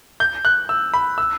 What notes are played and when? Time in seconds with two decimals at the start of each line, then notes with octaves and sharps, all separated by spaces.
0.20 G6
0.45 F#6
0.69 E6
0.94 B5
1.18 E6